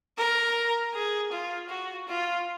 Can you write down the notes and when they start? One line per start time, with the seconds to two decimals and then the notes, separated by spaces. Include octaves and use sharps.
0.18 A#4
0.94 G#4
1.32 F4
1.70 F#4
2.08 F4